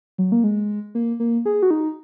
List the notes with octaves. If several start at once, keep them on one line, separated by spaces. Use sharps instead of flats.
F#3
A#3
G#3
A#3
A#3
G#4
F#4
D#4